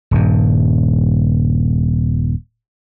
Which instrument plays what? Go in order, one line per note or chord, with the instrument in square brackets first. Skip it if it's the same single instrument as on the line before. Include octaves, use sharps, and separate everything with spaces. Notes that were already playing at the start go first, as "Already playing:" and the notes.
[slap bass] D#1 G2